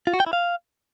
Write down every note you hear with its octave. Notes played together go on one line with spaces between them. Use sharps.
F4
F#4
G5
E4
F5